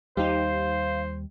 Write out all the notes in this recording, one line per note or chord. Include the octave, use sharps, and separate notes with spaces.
D#2 G3 D#4 G4 C5 F5